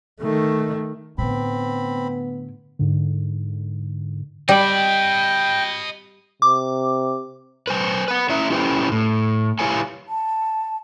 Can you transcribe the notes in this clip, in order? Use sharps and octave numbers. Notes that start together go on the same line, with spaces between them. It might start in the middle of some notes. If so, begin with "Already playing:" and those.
D#3 A3
A2 D3 B3 C4 B5
G#2 D3
G3 D#5 G5 B5
C3 D6
B4 C5 G#5
B4 F#5
C#4 E4 C#5 E5 A#5
C#4 E4 G4 B4 C5 G5
A2
E4 G4 B4 C#5 F5 G#5
A5